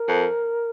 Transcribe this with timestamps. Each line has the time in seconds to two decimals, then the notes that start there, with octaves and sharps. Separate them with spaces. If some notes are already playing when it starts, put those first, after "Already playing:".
Already playing: A#4
0.08 F2